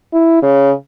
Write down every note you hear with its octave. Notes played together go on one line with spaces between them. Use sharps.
E4
C#3